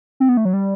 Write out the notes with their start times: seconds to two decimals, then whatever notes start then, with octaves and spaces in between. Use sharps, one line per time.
0.20 C4
0.29 B3
0.37 A3
0.45 F#3
0.53 G3